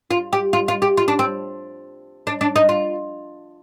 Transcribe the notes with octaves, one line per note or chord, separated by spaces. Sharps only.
F4
G4
F4
F4
G4
F4
D4
C4
D4
D4
D#4
F4